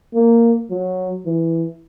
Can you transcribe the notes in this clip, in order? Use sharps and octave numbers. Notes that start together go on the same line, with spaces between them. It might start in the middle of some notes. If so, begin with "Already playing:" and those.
A#3
F#3
E3